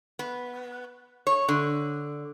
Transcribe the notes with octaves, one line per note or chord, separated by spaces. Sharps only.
B3
C#5
D3